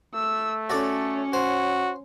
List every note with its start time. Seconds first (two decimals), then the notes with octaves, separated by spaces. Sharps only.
0.15 A3 E6
0.70 C#4 F#4 A4 C#5 D5
1.33 F#4 C5